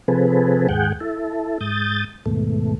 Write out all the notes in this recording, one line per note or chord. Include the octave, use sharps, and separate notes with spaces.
C3 F3 C4 G#4 A4 B4
D#2 G#2 G#4 F#5 G5
E4 A4
G#2 D#6 G6 A6
D#2 G#2 B2 A3